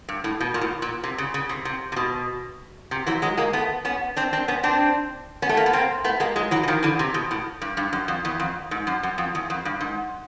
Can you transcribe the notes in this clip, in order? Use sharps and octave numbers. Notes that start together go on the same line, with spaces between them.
G2
A2
B2
A#2
A2
A#2
C3
C#3
C#3
C3
C3
C3
B2
C3
E3 F#3
F#3 G#3
G#3 A#3
A3 B3
B3 C#4
C4 D4
C4 D4
B3 C#4
C4 D4
B3 C#4
A3
A#3
B3
A#3 C4
A3 B3
G#3 A#3
F#3 G#3
E3 F#3
E3
D#3 F3
D3 E3
C3
B2
A2
G2
G2
F#2
F2
E2
F2
G#2
F#2
F#2
F2
E2
F2
G2
G#2